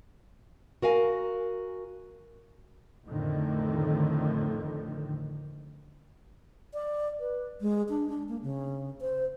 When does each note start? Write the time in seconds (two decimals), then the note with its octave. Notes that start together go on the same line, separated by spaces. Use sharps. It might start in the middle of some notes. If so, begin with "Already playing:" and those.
0.82 F#4 A#4 F5 G#5
3.07 F2 A2 D3 D#3
6.74 D5
7.20 B4
7.61 G#3
7.89 D4
8.09 D4
8.29 A#3
8.43 C#3
9.01 C5